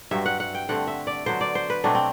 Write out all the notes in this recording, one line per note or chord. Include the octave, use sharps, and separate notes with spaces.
G2 F#3 C4 E5
F#5
F#5
G5
G2 D3 A3 C4 F#5
E5
D5
D3 F#3 B3 C5
D5
C5
B4
B2 F#3 A3 C4 D4
C4